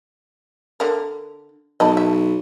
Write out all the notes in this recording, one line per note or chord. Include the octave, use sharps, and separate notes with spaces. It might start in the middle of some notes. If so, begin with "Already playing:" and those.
D3 A#4
B1 D#5 A5 B5
E5